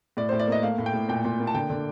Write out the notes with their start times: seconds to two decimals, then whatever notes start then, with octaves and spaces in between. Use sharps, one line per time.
0.17 A2 D5
0.29 A2 C5
0.40 D5
0.48 A#3 D#5
0.63 A3 F5
0.78 A2
0.86 G5
0.93 A2
1.09 A#2 G5
1.25 A#2
1.40 A#3
1.47 A5
1.54 D3 G5
1.70 D3